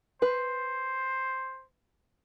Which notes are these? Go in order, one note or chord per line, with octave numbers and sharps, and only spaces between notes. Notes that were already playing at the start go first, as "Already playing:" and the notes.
B4 C5